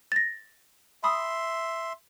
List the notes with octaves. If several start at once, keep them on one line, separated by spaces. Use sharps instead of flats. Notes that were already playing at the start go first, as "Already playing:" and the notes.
A6 A#6
E5 G#5 B5 C6 D#6